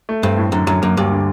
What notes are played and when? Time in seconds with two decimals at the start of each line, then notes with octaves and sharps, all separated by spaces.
0.09 A3
0.23 G2 C4
0.38 A2
0.52 F#2 D3
0.67 F#2 F#3
0.82 F#2 A#3
0.97 D2 G2
1.12 D3